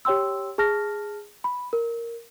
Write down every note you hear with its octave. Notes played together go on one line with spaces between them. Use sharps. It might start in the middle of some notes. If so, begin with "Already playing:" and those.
G4 C#5 G5 C6 E6
G#4 A5 F6 A#6
B5
A#4